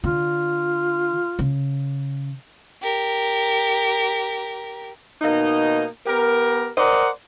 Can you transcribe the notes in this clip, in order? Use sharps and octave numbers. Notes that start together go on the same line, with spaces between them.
D3 F4
C#3
G4 A#4
B2 A#3 D#4
B3 G4 A#4
A#4 C5 D5 D#5 F#5